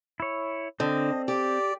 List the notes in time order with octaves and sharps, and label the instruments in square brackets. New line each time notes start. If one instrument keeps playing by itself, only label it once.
[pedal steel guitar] E4 C#5
[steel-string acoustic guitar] D3 [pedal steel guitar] C4 [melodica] D#5
[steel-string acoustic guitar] G4 [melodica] D5